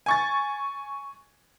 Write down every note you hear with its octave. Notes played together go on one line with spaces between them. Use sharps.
G#5 C#6 A6